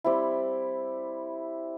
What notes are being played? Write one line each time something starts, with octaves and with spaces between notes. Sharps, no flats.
G3 C4 E4